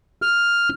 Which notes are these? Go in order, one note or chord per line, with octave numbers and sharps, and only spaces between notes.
F6